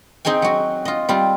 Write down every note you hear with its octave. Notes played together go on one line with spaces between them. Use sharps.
C4 D#4 G#4 G5 G#5
F#3 F#4
F4 D#5
G3 C4 F4